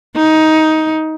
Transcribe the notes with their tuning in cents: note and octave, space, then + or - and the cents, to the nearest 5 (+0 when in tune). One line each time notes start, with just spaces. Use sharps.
D#4 +15